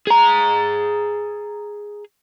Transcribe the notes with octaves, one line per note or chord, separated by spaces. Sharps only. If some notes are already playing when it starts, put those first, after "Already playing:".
G#4 A#5